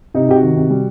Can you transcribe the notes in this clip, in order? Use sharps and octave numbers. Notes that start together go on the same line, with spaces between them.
C3 D#4
C3 G4
F#4
D#3
C3
G3